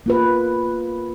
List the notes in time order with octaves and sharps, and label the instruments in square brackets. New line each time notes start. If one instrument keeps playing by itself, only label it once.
[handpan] A#3 F4 B4